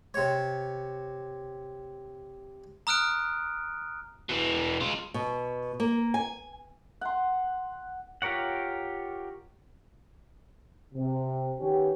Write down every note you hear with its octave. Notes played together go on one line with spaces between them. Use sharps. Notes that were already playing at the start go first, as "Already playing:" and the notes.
C3 C#5
A#5 D#6 F6 F#6 D7
B2 E3
G#3 F4
B2
A#3
G#5
F#5 C6
F4 G4 A#4 C#5 F#5
C3
D#3 B3 C#4 G4